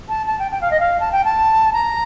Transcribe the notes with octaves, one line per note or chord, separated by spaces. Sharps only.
A5
A5
G5
G5
F5
D#5
F5
A5
G5
A5
A#5